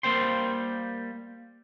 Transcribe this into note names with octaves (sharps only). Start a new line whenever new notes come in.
G3 A#3 C5 G5 C6